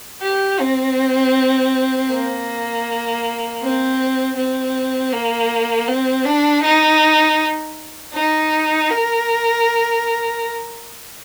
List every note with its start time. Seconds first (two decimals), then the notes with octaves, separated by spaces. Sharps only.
0.23 G4
0.60 C4
2.11 A#3
3.62 C4
4.37 C4
5.13 A#3
5.88 C4
6.26 D4
6.64 D#4
8.14 D#4
8.90 A#4